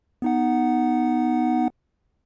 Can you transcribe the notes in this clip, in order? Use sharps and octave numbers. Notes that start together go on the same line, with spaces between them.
B3 D#4 F#5